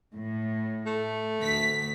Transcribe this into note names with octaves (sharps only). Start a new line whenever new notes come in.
A2
A3
D2 B6